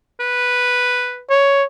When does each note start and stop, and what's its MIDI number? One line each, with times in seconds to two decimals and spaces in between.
0.20 1.21 71
1.30 1.65 73